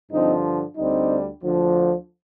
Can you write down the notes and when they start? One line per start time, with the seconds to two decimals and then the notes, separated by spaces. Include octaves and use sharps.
0.11 G2 D3 F3 C4 D#4
0.77 D2 D3 G3 C4 D#4
1.42 D2 D3 F3